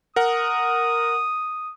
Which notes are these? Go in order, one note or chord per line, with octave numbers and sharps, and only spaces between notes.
A#4 F#5 D#6